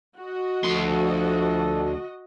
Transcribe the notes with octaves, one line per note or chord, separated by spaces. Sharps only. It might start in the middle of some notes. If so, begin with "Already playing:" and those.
F#4 D#5
D2 F3 A4 C6